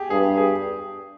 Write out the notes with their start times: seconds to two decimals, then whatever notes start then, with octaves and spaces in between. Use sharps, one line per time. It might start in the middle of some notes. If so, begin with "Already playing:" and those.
Already playing: G4 G#4
0.10 G2 G#4
0.38 G#4